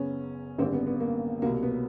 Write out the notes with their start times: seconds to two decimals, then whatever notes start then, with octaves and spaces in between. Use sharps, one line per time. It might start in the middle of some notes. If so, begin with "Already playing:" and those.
Already playing: F#1 F#2 C#3 B3 C#4
0.58 G#1 F#2 D3 G3 A#3 C4
0.73 B3
0.87 B3
1.00 A#3
1.42 C2 B2 F#3 A#3
1.63 B3